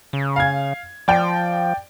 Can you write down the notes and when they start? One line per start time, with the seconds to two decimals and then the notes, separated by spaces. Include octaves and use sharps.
0.13 C#3
0.36 F5 G#6
1.08 F3 D5 G5